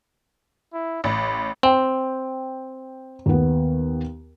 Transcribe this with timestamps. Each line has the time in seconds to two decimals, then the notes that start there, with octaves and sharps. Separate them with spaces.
0.73 E4
1.04 A1 B5
1.63 C4 G5
3.26 D#2 B3